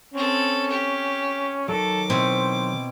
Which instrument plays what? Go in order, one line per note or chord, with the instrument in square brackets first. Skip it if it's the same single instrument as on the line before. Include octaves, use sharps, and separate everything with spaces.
[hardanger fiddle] C4 A4 [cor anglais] C#4
[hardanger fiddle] G4
[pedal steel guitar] D#3 F#3 [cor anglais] A4 [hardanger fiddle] D6
[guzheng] B2 C4 E4 [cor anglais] C5